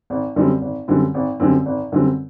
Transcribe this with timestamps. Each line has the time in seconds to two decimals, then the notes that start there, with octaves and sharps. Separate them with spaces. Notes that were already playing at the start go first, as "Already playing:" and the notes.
0.10 G#1
0.36 F#2 D3 G3 C4
0.62 G#1
0.88 F#2 D3 G3 C4
1.14 G#1
1.40 F#2 D3 G3 C4
1.66 G#1
1.92 F#2 D3 G3 C4